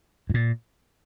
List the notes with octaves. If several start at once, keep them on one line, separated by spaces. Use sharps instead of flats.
G#2
A#2